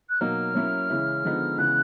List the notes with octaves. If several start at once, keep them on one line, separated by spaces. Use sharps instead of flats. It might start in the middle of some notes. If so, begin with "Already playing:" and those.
F#6
B2 F#3 A#3 D#4 F6
F#3 A#3 C#4 E4
C#3 E3 G#3 C#4 E4
D3 F3 G#3 B3 D#4
C#3 E3 G#3 B3 F#6